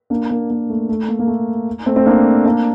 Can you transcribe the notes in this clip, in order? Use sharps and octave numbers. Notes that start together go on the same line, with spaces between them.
A#3 D4
A#3
A#3
A3
A3
A#3
A#3
A3
A3 C4
A3 C4
A#3 D4
A#3 D4